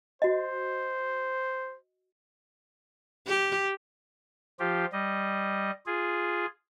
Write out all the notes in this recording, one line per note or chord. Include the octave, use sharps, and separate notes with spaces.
F#4 C5 D#5
G4
F3 F4 G4
G3 D#5
F4 G#4